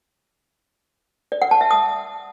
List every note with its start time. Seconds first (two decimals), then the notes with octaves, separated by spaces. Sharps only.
1.32 D5
1.42 F#5
1.51 A5
1.61 E5
1.71 D#6